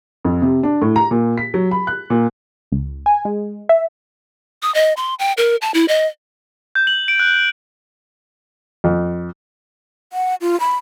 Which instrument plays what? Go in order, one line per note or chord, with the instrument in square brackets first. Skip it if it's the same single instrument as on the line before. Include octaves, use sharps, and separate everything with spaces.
[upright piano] F2
C3
D4
A2
A#5
A#2
B6
F#3
B5
F#6
A#2
[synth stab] C#2
G#5
G#3
E5
[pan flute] D#6
D#5
C6
G5
A#4
A5
E4
D#5
[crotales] G6
F#7
D7
F#6
[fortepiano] F2
[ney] F#5
F4
B5